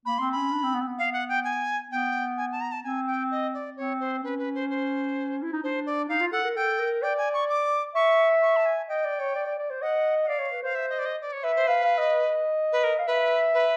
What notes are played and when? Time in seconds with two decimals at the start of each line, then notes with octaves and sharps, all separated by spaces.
0.05 A#3 B5
0.18 C4 C6
0.32 C#4 B5
0.51 D4
0.63 C4
0.74 B3
0.81 C4
0.87 B3
0.99 F5
1.13 F#5
1.29 G5
1.44 G#5
1.91 B3 G5
2.37 G#5
2.52 A5
2.61 A#5
2.72 A5
2.84 C4 G#5
3.07 G5
3.31 D#5
3.54 D5
3.77 C4 C#5
4.00 C5
4.23 C#4 B4
4.39 B4
4.55 C5
4.70 C5
5.42 E4
5.53 D#4
5.63 D4 C5
5.86 D5
6.09 D#4 F5
6.21 F4
6.32 A4 F#5
6.44 A#4
6.55 A4 G5
6.79 A#4
7.02 D5 G5
7.18 G#5
7.34 C#6
7.50 D6
7.95 E5 C#6
8.42 C#6
8.56 A5
8.66 G#5
8.89 D#5 G5
9.04 D5
9.20 C#5
9.35 D5
9.47 D5
9.59 D5
9.70 C5
9.82 D#5 F#5
10.23 F#5
10.28 D5 F5
10.39 C#5
10.52 B4
10.63 C5 F5
10.75 E5
10.90 D#5
10.99 D5
11.06 D#5
11.22 D5
11.33 C#5
11.44 B4 E5
11.56 C5
11.67 B4 F5
11.83 F5
11.98 D#5
12.72 B4
12.84 A#4
12.99 F5
13.07 B4 E5
13.54 B4